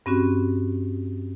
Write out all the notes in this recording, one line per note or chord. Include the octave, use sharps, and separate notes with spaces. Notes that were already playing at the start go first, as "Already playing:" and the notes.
G2 C4 C#4 F#4